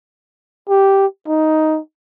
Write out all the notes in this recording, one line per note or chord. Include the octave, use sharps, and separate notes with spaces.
G4
D#4